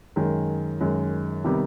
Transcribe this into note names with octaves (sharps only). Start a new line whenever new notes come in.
F#2 D#3 G#3
F#2 D#3 G#3
C3 D#3 G3 B3